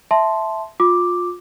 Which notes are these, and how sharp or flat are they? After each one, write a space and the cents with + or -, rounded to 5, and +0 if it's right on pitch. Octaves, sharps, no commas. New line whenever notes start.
E5 +0 A5 -10 C6 +0
F4 +25 D6 +0